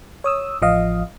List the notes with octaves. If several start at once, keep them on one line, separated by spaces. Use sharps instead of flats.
C#5 D#6 E6
A1 F3 D#5 F5